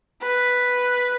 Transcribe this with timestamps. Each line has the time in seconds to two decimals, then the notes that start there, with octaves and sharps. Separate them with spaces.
0.22 B4